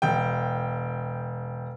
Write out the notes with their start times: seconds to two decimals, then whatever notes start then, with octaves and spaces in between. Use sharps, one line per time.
0.02 E1 G5